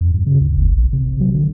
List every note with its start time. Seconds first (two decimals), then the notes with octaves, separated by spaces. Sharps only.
0.01 F2
0.14 G2
0.26 C#3
0.41 D2
0.56 F1
0.72 A#1
0.93 C3
1.20 F#3
1.34 D3